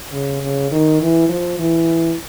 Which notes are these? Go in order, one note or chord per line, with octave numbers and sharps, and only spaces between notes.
C#3
C#3
D#3
E3
F3
E3